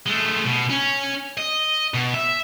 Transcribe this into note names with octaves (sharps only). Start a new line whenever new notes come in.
G#3 A3
B2
C#4
D#5
B2
E5